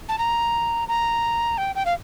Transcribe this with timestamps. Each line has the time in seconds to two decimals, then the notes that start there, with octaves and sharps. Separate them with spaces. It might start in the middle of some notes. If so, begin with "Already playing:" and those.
0.09 A5
0.19 A#5
0.88 A#5
1.58 G5
1.75 G5
1.86 F5